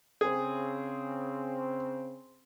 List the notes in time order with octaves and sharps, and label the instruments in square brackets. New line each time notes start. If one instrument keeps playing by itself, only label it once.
[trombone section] C#3 C4 [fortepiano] G#4